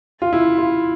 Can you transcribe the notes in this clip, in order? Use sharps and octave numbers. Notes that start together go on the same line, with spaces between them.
F4
E4
F4